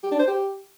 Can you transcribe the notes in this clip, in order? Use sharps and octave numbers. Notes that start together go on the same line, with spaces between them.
G4
D4
C5
G4